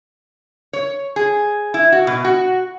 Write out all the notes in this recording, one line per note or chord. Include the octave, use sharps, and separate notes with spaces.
C#5
G#4
E4
F#4
B2
F#4